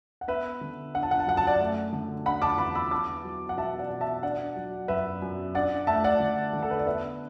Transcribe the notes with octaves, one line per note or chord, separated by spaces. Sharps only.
F#5
B3 B4 E5
D3
D4 F#5
A5
F#5
A5
F#2 F#5
A5
D5 F#5
A3
D3
D4 F#5 B5
A5 D6
E2 F#5 B5
B5 E6
B3 A5 D6
F#3
F#5
B2 E5 A5
D5 F#5
B2
E5 A5
D4 D5 F#5
F#3
F#2 B4 E5
F#2
D4 D5 F#5
A3 E5 A5
D5 F#5
D3
D3
A4
B4
D5
B3 B4 E5